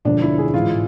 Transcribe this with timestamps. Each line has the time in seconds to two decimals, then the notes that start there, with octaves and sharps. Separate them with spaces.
0.05 E1 D2 D3 F3 D4
0.22 E4
0.38 G#4
0.54 A1 G#2 E3 F4